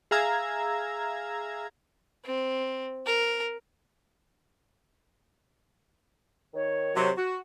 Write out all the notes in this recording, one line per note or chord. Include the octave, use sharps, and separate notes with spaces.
G#4 E5 F5 A#5 E6 G#6
C4
A#4
D#3 C#5
C3 F#3
F#4